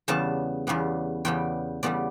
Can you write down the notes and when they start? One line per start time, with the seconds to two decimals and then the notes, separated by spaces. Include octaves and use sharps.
0.08 E2 C#3 G3 B3 A5
0.67 E2 C#3 G3 B3
1.25 E2 C#3 G3 B3 G5
1.83 E2 C#3 G3 B3 D5